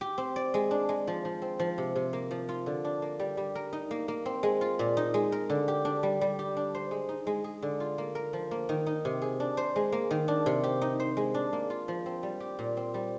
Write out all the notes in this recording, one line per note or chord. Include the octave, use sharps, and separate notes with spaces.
G4
C4
D5
G#3
D4
G#3
F3
F3
C4
F3
C3
C3
A#3
F3
F4
D3
D4
A#3
G3
G3
A#4
D#4
A#3
A#3
C4
G#3
F4
A#2
D#4
G#3
A#4
D3
G4
D4
G3
G3
G4
D4
C5
G#3
D#4
G#3
G#4
D3
F4
A#3
A#4
F3
A#3
D#3
D#4
C3
G#4
D4
C5
G#3
A#3
D#3
D4
C3
G4
D#4
C5
G#3
D4
A#3
F4
F3
C4
G3
G4
A#2
C4
G3